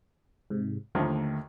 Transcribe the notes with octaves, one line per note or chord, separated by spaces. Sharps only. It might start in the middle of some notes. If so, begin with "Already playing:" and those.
G#2 C3
D#2 D3 D#3 F3 A3